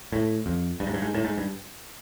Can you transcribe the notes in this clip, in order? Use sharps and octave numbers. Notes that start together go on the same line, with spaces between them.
A2
F2
G2
G#2
G2
G#2
A2
G#2
G2